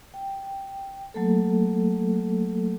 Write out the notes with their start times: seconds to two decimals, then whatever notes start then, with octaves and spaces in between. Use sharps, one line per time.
0.14 G5
1.14 F#3 A3 A#3 A4